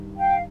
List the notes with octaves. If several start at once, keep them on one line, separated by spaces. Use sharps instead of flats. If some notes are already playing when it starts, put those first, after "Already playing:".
Already playing: G2 D#3 G3
F5 G5